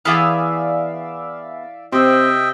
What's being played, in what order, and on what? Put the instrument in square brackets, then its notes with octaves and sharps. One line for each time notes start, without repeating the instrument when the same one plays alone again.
[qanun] E3 [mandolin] B3 G#4 [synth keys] D5 E5 F5
[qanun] C3 [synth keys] C4 [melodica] D#5 E5 G5